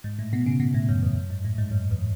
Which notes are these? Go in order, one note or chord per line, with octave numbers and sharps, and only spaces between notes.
G#2
A2
B2
C#3
B2
A2
F#2
E2
F#2
G#2
A2
G#2
F#2
E2